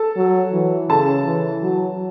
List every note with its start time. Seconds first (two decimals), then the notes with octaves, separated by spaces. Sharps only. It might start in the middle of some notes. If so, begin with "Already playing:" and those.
Already playing: A4 A5
0.17 F#3
0.53 E3
0.89 C#3 A4 A5
1.26 E3
1.62 F#3